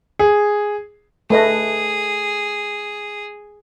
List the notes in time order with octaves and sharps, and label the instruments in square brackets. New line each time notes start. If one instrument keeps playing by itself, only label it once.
[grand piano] G#4
[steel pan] A3 B4 D#5 [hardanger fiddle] G#4